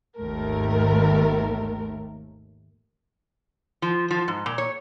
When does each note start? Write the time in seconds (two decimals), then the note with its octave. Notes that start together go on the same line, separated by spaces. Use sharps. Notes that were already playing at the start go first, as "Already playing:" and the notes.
0.17 G#1 D#2 A3 A#4
3.82 F3
4.11 F3
4.28 G#2
4.46 A#2
4.58 C#5